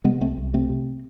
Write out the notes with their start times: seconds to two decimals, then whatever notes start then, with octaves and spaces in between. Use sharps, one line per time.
0.04 C3 G#3 B3
0.20 C2 A3 C4
0.38 C2
0.53 C3 A3 C4
0.69 C3